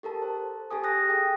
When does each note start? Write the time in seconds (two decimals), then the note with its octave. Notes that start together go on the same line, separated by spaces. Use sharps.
0.03 G4 A4 A#4 A5
0.22 C5
0.71 G4 A4 G#5 D#6
0.84 G#5 D#6 F#6 A#6
1.08 G#4 G5 D#6